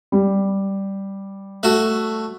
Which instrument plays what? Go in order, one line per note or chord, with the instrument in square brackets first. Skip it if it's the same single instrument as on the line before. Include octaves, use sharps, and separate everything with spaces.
[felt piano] G3
[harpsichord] A3 F#4